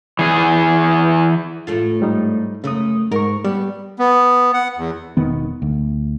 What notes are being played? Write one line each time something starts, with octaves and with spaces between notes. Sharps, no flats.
E3 G#4
A2 A3 F4
G#2 G3 D#4
F#2 C#3 A3 D#6
G#2 A#4 C#6
G3 B3
B3
F#5
E2
E1 D#3 B3
D2